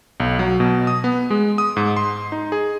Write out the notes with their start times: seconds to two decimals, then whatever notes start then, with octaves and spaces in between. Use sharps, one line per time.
0.20 B1
0.39 F#3
0.60 B2
0.87 D#6
1.04 B3
1.30 G#3
1.58 D#6
1.77 G#2
1.97 C6
2.32 D#4
2.52 G#4